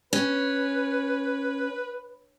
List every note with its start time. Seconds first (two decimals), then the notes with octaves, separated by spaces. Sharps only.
0.13 C#4 B4